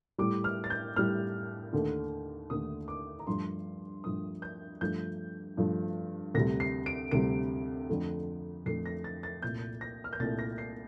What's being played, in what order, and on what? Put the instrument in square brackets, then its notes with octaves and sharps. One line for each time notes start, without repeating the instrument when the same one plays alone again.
[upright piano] A2 G3 D6
F6
A6
G6
A2 G3 F6
D#2 D3 A3
D#2 D3 A3 D#6
D6
A#5
G2 F3 A3 C6
G2 F3 A3 D#6
G6
G2 F3 A3 G6
G2 F3 A3
D2 C3 G3 A#6
C7
D7
D2 C3 G3 D7
F2 D3 A3
F2 D3 A3 C7
A#6
A6
A6
C2 A#2 A3 G6
A#6
F6
G6
C2 A#2 A3 A6
A#6
C7